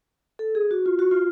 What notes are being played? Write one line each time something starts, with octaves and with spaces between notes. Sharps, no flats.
A4
G#4
F#4
F4
F#4
F4